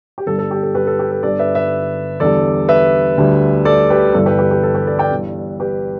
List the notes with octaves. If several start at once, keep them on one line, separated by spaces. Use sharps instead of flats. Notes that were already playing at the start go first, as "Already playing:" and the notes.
G4
G1 G2 G3 A4
A4
G4
A4
G4 B4
A4
G4
A4
G1 G2 D3 A4 D5
B4 E5
B4 E5
E2 D3 G3 A4 D5
B4 E5
D2 D3 G3
A4 D5
G4 B4
G1 G2 E3 G3 A4
G4 B4
G4 B4
G4
A4
G4 B4
A4 D5
D5 G5
G1 G2 E3
G4 B4